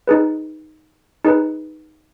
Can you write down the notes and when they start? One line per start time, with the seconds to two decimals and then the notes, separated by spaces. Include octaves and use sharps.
0.08 D#4 G#4 B4
1.25 D#4 G#4 B4